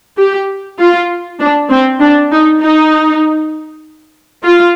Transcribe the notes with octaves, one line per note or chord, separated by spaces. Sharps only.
G4
F4
D4
C4
D4
D#4
D#4
F4